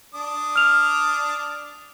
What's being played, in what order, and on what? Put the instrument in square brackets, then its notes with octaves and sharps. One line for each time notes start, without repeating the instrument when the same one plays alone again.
[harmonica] D4 D#6
[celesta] F6 F7